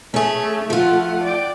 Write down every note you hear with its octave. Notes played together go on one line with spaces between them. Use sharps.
A3 C#4 G#4
F3 A3 F4 F#5
D5 G5